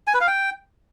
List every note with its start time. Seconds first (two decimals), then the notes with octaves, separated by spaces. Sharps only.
0.07 G#5
0.14 B4
0.21 F5
0.27 G5